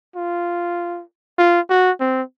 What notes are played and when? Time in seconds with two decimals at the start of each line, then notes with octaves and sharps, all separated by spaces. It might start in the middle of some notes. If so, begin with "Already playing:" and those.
0.16 F4
1.39 F4
1.70 F#4
2.00 C4